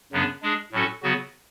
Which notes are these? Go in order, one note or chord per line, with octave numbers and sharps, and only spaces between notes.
F#2 C#3 F#3 B3 D4
G#3 D4 G#4
A2 F#3 C#4 F#4 A4
C#3 F#3 B3 F#4